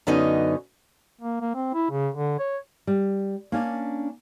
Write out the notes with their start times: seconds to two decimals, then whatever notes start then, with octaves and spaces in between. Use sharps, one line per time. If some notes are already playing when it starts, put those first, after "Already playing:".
0.07 F#2 D3 B3 C#4 D#4 D#5
1.21 A#3
1.41 A#3
1.55 C4
1.74 E4
1.91 C#3
2.14 D3
2.39 C#5
2.87 G3
3.52 A#3 C#4 D4